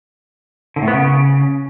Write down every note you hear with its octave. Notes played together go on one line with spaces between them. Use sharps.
D3
A2
B3
C#3